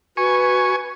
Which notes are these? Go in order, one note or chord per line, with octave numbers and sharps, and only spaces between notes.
F#4 B4 G#5 C#6